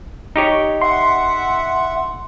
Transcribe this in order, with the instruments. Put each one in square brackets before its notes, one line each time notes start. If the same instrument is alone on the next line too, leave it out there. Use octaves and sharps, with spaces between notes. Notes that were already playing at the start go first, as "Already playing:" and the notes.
[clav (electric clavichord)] D#4 G4 C#5
[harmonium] E5 F#5 [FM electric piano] C6